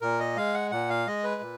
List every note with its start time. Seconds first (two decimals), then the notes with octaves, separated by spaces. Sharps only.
0.01 A#2 A#4
0.20 D#5
0.36 G#3 F5
0.54 F#5
0.71 A#2 F#5
0.90 F5
1.07 G#3 D#5
1.24 B4
1.41 A#2